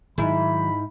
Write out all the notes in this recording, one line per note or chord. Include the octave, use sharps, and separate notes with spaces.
G#2 D#3 E3 F#3 E4 B5